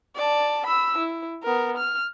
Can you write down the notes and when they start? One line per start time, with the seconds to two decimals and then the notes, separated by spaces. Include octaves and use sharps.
0.16 D5 A5
0.66 B5 E6
0.98 E4
1.43 B3 A#4
1.78 F6